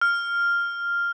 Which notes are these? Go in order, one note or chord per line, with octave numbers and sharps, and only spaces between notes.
F6